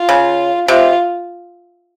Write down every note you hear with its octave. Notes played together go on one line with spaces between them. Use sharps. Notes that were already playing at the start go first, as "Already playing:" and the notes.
Already playing: F4
C#3
C3 F4